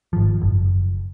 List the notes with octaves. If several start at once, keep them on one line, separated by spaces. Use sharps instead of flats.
G#1 F3
F#1